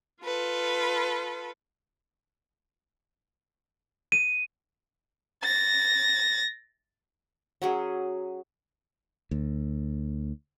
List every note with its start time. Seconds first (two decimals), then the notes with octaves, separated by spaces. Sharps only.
0.23 F4 A4 B4
4.12 D#7
5.44 A6 A#6
7.62 F#3 C#4 G#4
9.31 D2